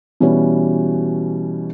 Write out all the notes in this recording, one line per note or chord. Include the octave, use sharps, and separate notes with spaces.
B2 E3 G3 C#4 F#4